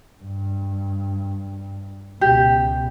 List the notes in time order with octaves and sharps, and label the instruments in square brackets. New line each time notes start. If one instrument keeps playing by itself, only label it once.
[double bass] G2
[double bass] C#2 B2 [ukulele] G4